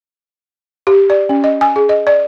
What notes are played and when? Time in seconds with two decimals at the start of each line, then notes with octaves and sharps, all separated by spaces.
0.87 G4
1.10 D5
1.29 C#4
1.44 D#5
1.61 G#5
1.76 G#4
1.89 D#5
2.07 D5